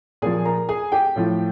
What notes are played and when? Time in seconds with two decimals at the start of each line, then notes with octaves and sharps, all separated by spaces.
0.22 A#2 F3 G#4 G#5
0.45 A#4 A#5
0.69 G#4 G#5
0.92 G4 G5
1.16 A2 F3